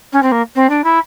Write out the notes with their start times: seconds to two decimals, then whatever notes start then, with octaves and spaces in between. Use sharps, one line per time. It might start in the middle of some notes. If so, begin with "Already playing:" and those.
0.13 C#4
0.23 C4
0.32 A#3
0.56 C4
0.70 D4
0.84 E4